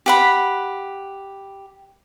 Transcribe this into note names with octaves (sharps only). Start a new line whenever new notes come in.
G4 F#5 B5